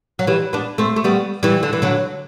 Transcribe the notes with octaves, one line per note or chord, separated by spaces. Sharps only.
F#3
E3 G3
B3 D4
A3 C4
A3
G3 B3
E3 G3
D3
E3
D3 F#3